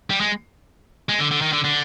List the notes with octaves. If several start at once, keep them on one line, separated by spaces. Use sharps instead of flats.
G3
G#3
G#3
D3
D3
D#3
D3
D3